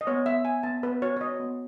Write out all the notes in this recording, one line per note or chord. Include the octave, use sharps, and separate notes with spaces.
D#5
B3 C#5
B3 E5
B3 G#5
B3 A5
B3 B4
F#4 C#5
C#5
F#4 D#5
B3